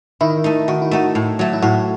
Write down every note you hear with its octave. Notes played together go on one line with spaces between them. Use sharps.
D#3 E4
A3 D#4
D#3 F#4
E4
A3 D#4 F#4
A2
F#3 A3
E4
A2 F#4